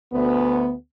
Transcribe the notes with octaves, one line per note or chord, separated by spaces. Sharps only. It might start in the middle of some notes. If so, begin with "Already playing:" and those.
D2 B3